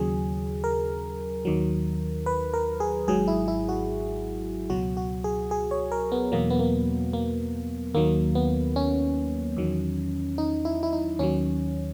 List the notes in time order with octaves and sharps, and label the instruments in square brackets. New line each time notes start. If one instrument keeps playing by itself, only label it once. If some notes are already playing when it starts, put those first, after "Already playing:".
Already playing: [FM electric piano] D#2 C#3 F#3 G#4
A#4
D#2 D#3 F#3
B4
A#4
G#4
G#1 G#2 F#3 G#4
E4
E4
F#4
C#2 B2 F#3 F#4
F#4
G#4
G#4
C#5
A#4
B3
E2 B2 F#3 A#3
B3
A#3
A#3
D#2 D#3 F#3 A#3
B3
C#4
E2 D#3 F#3
D#4
E4
E4
D#4
D#2 D#3 F#3 C#4